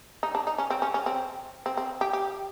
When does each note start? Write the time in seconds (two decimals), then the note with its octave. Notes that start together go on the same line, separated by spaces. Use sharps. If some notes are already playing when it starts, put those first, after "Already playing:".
0.23 D#4
0.35 D4
0.47 D#4
0.58 C#4
0.70 C4
0.82 C#4
0.94 C#4
1.06 C4
1.66 C4
1.77 C4
2.01 G4
2.13 G4